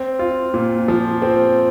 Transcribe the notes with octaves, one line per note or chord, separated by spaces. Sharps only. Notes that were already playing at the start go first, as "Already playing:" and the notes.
Already playing: C4
F4
A#2
F3
C4